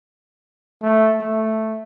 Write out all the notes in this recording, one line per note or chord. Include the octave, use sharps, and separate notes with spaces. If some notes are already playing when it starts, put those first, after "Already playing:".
A3
A3